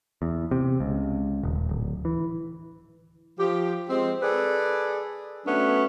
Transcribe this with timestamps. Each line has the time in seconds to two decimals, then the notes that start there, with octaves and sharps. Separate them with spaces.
0.22 E2
0.51 C3
0.80 C#2
1.43 D#1
1.69 D1
2.05 E3
3.39 F3 G4
3.89 F3 G#3 C4
4.22 G#4 A4 B4 D5
5.46 F#3 A3 B3 C#4 D4